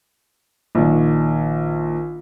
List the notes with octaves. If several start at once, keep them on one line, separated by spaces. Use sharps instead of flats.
A#1 D#3